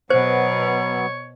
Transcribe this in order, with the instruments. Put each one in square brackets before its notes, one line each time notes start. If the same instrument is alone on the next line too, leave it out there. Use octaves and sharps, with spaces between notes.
[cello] B2 [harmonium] F#3 B3 [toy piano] C5 [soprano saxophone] C#5